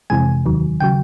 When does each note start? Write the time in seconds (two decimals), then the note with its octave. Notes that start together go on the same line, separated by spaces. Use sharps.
0.10 F2 C3 E3 G#3 G#5
0.46 D#2 D#3 F#3
0.80 C#3 F#3 G5